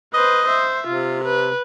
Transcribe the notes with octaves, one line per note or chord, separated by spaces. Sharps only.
B4 C5 D#5
C5 E5
C3 F4
B4